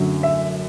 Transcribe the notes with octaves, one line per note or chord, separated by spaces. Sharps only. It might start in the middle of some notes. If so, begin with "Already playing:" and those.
Already playing: F#2 D3 F#3 A3
E5